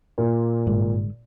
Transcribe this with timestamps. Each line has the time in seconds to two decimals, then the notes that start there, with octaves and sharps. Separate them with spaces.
0.18 A#2
0.67 G1 G#2 G#3